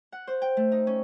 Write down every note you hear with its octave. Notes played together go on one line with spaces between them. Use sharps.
F#5
C5
G5
A3
D#4
C#4